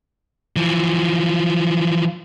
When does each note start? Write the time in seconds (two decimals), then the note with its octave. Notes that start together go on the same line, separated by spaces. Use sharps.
0.56 E3 F3